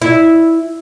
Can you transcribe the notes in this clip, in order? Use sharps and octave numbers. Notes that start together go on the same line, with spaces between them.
E4